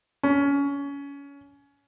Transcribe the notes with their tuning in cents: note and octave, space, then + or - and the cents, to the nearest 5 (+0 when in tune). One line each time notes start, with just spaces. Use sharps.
C#4 +25